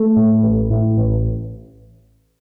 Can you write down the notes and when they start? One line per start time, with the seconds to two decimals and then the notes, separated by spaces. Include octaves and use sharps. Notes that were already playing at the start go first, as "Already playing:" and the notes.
Already playing: A3
0.17 A2
0.43 A1
0.70 A2
0.98 A1